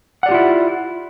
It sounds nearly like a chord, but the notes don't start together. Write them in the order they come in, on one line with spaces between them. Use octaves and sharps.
F#5 D5 G4 F4 E4